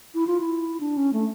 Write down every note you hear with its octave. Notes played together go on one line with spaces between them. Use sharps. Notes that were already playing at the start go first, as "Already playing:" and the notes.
E4
F4
E4
D4
C#4
A3